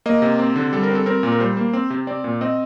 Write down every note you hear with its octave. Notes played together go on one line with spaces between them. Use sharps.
A#3 D#5
C3
C4
D3
G3 A4
A#4
C4
A4
C4 A#4
A#2
A#4
G3 C5
A#3
C4
C3
C4 D5
A#2
C4 D#5